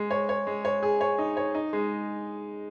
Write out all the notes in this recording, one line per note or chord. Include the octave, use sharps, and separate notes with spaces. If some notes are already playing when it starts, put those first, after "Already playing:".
Already playing: G#3
C#5
C#5
G#3
C#5
G#4
C#5
D#4
C#5
D#4
G#3